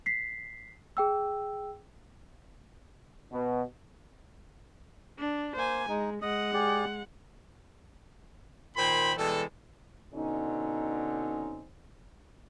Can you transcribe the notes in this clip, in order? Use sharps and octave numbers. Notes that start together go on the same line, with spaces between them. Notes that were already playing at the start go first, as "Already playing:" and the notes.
B6 C7
G#4 G5 E6
B2
D4
A#3 C5 G#5
G#3 D#4
G#3 D#5 F#5 D#6
G4 G#4 D5
A#2 D#3 C5 G5 B5 C6
B2 E3 G3 G#3 A4
B2 D3 C4 C#4 D#4